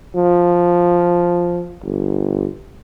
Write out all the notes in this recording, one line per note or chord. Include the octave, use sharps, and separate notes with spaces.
F3
G1